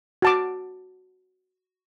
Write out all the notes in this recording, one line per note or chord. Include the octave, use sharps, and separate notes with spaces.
F#4 A5 D6